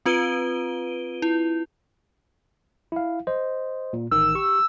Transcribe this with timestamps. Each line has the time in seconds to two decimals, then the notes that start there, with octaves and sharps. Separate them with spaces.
0.06 C4 F4 B4 D7 D#7 G7
1.22 E4
2.92 E4 F5
3.27 C5 D#5
3.93 A#2
4.11 A1 D#3 E6
4.35 G4 C#6